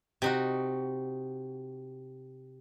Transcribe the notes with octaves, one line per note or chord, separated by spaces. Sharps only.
C3 D#4 F#4